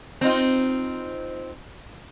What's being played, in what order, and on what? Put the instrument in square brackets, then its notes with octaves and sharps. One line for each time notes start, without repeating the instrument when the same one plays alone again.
[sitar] C4 D#4 F4